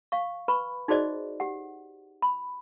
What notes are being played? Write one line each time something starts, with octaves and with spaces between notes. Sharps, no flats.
F5 C#6
B4 B5 C#6
D#4 F#4 G#4 C5 D5 D#5
G4 F#5
B5